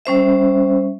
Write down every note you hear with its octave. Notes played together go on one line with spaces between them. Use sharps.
G3 C#4 C5 E5